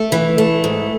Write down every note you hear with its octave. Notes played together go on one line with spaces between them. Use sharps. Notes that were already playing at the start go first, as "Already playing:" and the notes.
Already playing: A3
E3
A3
G#2